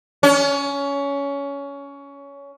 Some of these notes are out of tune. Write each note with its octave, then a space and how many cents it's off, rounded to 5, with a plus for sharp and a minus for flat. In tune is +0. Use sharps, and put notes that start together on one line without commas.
C#4 +20